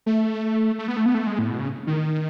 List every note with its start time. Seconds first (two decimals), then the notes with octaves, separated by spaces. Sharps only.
0.06 A3
0.79 A3
0.88 B3
0.97 A3
1.06 B3
1.15 A3
1.27 G#3
1.39 A2
1.51 B2
1.60 C#3
1.87 D#3